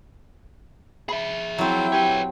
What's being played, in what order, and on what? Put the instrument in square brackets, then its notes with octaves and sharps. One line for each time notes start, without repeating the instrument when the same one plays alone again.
[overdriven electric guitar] G#4 E5 [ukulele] B5
[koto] F#3 C4 [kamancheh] E4 G5
[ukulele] G4 [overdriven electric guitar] B4 C#5